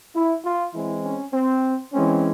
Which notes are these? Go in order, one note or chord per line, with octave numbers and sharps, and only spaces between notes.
E4
F4
E3 G#3 C4 E4
C#4
C4
E3 G#3 C4 C#4